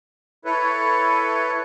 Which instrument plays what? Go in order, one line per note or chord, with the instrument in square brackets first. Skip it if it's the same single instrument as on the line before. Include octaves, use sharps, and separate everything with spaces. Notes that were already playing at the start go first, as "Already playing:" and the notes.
[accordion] E4 A4 B4 C#5